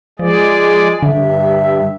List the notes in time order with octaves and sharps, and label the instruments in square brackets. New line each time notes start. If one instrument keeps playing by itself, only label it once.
[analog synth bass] F3 [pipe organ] G#3 G#4 D5
[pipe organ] G2 [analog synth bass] D3 [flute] E5